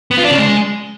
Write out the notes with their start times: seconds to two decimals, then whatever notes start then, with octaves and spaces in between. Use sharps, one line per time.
0.11 B3
0.18 F4
0.24 D4
0.31 C#3
0.38 G#3